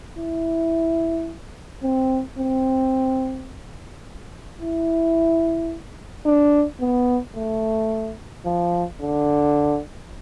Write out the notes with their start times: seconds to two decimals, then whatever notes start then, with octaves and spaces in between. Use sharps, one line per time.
0.18 E4
1.83 C4
2.39 C4
4.60 E4
6.25 D4
6.80 B3
7.36 A3
8.45 F3
9.01 D3